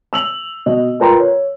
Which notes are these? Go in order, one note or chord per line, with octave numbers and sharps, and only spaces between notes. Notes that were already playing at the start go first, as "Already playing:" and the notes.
E6 F7 F#7
B2 F#4 D#5
F4 A#4 B4 G5 A#5 C6
C#5